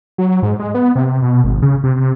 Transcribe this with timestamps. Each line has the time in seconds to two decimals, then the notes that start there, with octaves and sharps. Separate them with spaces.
0.18 F#3
0.43 G#2
0.59 G#3
0.74 B3
0.95 C3
1.22 B2
1.44 G#1
1.62 C#3
1.83 C3